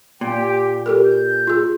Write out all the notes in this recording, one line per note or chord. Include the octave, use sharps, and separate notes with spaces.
A#2 G4 G5
G4 A4 A#4
G6
F4 G#4